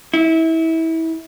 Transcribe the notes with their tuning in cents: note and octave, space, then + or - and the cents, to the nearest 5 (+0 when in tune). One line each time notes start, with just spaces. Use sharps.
E4 -25